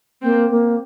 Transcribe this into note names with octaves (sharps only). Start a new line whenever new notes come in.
A#3 C4
A#3